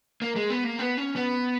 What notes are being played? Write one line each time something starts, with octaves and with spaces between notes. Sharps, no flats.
A#3
G#3
B3
A#3
B3
C#4
B3